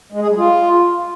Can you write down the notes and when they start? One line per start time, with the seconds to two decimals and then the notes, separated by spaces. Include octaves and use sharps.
0.12 G#3
0.21 G#4
0.29 G3
0.37 F4